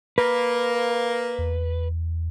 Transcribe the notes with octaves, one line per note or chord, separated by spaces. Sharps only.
A#3 B4
E2